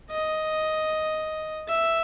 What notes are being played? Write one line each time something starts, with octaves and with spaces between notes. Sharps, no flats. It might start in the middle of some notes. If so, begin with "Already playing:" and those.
D#5
E5